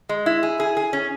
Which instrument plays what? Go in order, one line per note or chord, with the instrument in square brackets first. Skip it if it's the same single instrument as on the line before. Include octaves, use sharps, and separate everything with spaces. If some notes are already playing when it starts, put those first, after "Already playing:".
[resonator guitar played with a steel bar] G#3
E4
G#4
G#4
G#4
C#4